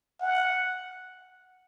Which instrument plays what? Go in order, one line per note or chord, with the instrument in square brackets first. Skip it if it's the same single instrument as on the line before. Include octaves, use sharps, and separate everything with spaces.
[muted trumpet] F#5